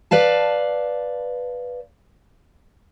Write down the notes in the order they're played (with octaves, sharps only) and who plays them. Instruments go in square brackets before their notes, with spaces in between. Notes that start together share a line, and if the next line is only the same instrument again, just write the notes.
[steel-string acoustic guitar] B4 D5 F5 A5